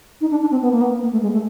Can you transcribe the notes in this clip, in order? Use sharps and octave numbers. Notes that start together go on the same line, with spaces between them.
D#4
D4
D4
C4
B3
A#3
B3
A#3
A3
G#3
A3